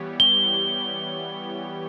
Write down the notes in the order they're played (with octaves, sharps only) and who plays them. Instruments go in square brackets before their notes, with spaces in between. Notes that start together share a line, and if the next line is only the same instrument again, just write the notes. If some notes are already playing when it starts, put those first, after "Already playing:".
Already playing: [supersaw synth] E3 G3 B3 G4 C#5
[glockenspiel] G7